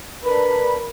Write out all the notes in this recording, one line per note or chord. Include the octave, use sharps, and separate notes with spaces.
D4 A#4 B4 B5